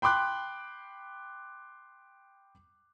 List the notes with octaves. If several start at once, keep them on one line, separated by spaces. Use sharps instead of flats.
G5 B5 C6 D6 F#6